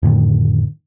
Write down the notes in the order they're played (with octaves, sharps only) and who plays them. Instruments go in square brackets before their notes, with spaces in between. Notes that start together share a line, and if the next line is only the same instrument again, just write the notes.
[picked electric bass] F2 A2 D3 D#3